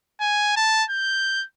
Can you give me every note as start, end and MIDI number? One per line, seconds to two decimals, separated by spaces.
0.20 0.54 80
0.56 0.84 81
0.90 1.45 91